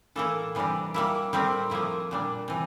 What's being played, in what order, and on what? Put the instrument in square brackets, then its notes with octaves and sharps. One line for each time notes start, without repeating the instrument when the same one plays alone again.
[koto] A2 E3 A#3 E4 A4
C3 E3 G3 D4 G4
G3 A#3 E4
A2 G3 C4 G4 A#4
A2 F3 A#3 E4
A#2 G3 D4
C3 E3